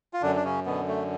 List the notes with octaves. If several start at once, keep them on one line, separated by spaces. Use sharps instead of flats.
F4
F#2 D3 D4
D4
C#3 C#4
B2 D3 B3
A3